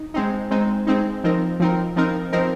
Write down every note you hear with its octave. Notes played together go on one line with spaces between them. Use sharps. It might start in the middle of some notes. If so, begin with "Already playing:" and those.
Already playing: D#4
G#3 C4 D#4
G#3 C4 D#4
G#3 C4 D#4
F3 C4 D#4 A#4
F3 C4 D#4 A#4
F3 C4 D#4 A#4
F3 C4 D#4 A#4